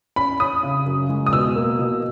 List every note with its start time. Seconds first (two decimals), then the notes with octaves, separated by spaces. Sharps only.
0.16 C#4 B5
0.40 C#4 D#6
0.63 C#3
0.86 F#2
1.09 G#3
1.27 D#6
1.33 B2 E6
1.56 A#3
1.79 B2